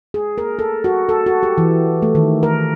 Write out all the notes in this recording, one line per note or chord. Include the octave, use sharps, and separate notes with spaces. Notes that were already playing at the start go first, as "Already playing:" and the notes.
G#4
A#4
A4
F#4
A4
F#4
G4
E3
A3
D#3
A#4